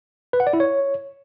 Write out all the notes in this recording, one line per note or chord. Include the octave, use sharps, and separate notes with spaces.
B4
F#5
D5
E4
C#5